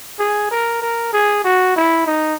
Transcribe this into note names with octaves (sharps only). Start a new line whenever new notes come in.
G#4
A#4
A#4
G#4
F#4
E4
D#4